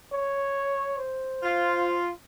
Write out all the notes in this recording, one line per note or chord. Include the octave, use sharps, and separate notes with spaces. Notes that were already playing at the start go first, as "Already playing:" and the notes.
C#5
C5
F4